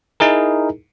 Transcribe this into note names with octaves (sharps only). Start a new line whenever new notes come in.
D#4 E4 G#4 A#4